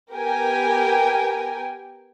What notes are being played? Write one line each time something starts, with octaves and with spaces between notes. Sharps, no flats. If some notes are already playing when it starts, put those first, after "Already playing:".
B3 G4 A#4 G5 G#5